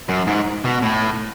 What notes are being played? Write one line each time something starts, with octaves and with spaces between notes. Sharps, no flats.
F#2
G#2
B2
A2